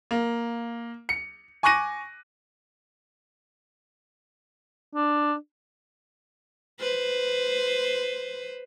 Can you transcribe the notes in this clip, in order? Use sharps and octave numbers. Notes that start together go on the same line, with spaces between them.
A#3
C#7
G#5 C#6 D6 F#6 A#6 D#7
D4
B4 C5